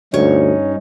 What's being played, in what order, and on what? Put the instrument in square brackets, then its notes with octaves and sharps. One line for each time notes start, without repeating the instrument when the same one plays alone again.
[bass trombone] D2 [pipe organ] G2 C#4 D#4 [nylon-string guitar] C#5